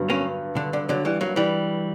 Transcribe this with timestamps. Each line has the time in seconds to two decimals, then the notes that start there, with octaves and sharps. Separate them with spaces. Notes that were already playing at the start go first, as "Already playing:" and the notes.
Already playing: G2 D3 F#3 B3 D4
0.10 A#3 C#4
0.56 D3
0.73 D3
0.89 D3 F#3
1.05 E3 G3
1.21 F#3 A#3
1.36 E3 G3